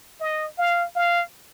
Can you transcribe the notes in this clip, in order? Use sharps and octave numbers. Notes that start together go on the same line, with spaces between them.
D#5
F5
F5